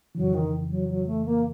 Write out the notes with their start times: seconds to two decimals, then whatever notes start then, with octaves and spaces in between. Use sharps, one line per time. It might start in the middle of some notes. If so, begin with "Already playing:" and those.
0.15 F2 C#3 E3 F#3
0.34 D#3
0.70 F#3
0.89 F#3
1.06 A3
1.25 A#3